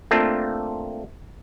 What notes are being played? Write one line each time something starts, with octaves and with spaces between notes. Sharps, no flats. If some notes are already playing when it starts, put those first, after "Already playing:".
A3 A#3 C4 D4 F4